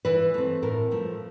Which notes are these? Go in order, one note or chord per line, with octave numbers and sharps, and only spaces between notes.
E3 B4
A3 C4
A2 A#4
F3 A3